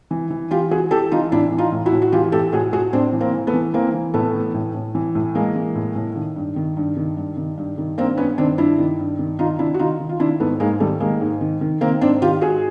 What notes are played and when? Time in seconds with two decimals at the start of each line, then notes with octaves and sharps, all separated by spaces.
0.11 E3
0.30 E3
0.51 E3 F4 G4
0.71 E3 F#4 G#4
0.91 E3 G4 A4
1.11 E3 D#4 F4
1.32 A2 D4 E4
1.52 E3
1.58 D#4 F4
1.72 A2
1.86 E4 F#4
1.92 A2
2.02 F#4
2.12 E3 F4 G4
2.32 A2 G4 A4
2.53 A2 F#4 G#4
2.73 A2 F#4 G#4
2.93 A2 C4 D4
3.13 E3
3.21 A#3 C4
3.33 E3
3.47 A3 B3
3.53 E3
3.74 E3 A#3 C4
3.94 E3
4.14 A2 A3 B3
4.35 E3
4.54 A2
4.74 A2
4.95 E3
5.15 A2
5.35 E3 G#3 A#3
5.56 E3
5.75 A2
5.96 A2
6.16 D#3
6.36 G2
6.56 D#3
6.77 G2
6.97 D#3
7.17 G2
7.37 D#3
7.57 G2
7.78 D#3
7.98 G2 A#3 C4
8.17 G2 B3 C#4
8.38 D#3 C4 D4
8.58 G2 D4 E4
8.78 D#3
8.99 G2
9.19 D#3
9.39 D#3 D#4 F4
9.59 D#3 D4 E4
9.74 F#4
9.79 D#3 D#4 F4
10.00 D#3
10.09 F4
10.20 D#3 D4 E4
10.40 G#2 A3 B3
10.60 G#2 G#3 A#3
10.80 D#3 G3 A3
11.00 D#3 G#3 A#3
11.21 G#2
11.41 D#3
11.61 D#3
11.81 D#3 A#3 C4
12.01 G#2 C4 D4
12.22 D#3 F4 G4
12.41 G#2 F#4 G#4